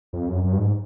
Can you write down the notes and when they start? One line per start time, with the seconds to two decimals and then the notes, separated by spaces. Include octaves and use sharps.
0.13 F2
0.28 F#2
0.44 F#2
0.52 G2
0.58 G#2